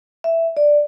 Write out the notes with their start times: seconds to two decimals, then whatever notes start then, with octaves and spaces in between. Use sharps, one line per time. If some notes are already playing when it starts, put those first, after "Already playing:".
0.24 E5
0.57 D5